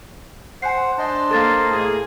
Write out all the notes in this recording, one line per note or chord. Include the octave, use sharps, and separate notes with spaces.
C5 F#5 G#5 C7
D4 C5 D#5 A5 C6
A#3 A4 A6
A2 G#4